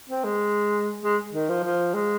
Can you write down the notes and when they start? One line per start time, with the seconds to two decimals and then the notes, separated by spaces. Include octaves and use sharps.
0.09 C4
0.24 G#3
1.02 G#3
1.32 D#3
1.49 F3
1.64 F3
1.94 G#3